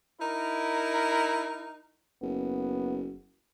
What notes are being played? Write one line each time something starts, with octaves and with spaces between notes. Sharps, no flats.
D#4 E4 A#4
F#1 B3